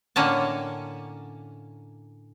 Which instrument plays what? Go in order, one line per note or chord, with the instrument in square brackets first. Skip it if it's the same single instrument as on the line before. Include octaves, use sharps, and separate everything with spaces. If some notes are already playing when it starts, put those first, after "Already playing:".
[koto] A2 D3 A#3 C#4 F#5 A5